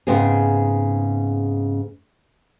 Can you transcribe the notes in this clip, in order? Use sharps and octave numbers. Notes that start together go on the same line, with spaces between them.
G#2 C#3 B3 C4 D#4 G#4